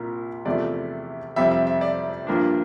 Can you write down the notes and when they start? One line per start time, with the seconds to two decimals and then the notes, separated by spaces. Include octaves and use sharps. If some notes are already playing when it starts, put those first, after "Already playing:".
Already playing: C2 A#2 A#4
0.45 E2 C3 F3 A3 D5
1.36 F2 C3 G3 C4 E5
1.51 E5
1.67 E5
1.81 D5
2.27 G2 F3 A#3 D4